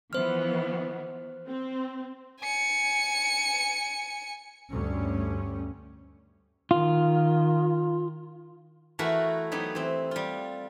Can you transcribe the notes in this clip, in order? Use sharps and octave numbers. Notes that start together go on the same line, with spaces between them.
E3 F3 B3 C5 F6
C4
G#5 C#7
D2 G2 G3 C#4
D#3 F4
E3 A3 E4 F#4 A#4
F#3 B3 D#4 G4
E3 C4
G3 F4